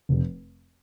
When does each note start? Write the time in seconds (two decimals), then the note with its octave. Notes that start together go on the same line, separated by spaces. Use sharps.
0.09 F1